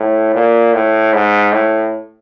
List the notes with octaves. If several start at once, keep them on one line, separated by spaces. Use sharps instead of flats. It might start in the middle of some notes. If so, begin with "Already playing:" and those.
Already playing: A2
A#2
A2
G#2
A2